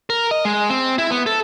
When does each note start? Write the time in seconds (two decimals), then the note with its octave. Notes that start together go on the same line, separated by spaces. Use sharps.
0.10 A#4
0.31 D#5
0.45 G#3
0.70 C4
0.98 E4
1.11 B3
1.26 A4